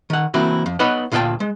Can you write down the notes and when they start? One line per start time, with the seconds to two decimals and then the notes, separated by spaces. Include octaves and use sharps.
0.10 D#3 F#5
0.34 E3 A#3 C4 E4 F#4
0.66 F2
0.79 B3 D#4 B4 C#5 D#5 F#5
1.11 D2 A#2 F4 F#5 G5 A5
1.40 G#3